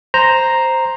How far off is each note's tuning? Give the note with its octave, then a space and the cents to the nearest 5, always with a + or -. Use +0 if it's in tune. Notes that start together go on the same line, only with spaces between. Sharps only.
C5 +0 A#5 +0